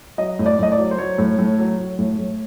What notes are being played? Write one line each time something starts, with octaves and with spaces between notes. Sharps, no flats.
F#3 D#5
A2
D5
A2 D#5
D5
F#3
C5
F#3 C#5
A2
A2
F#3
F#3
A2
A2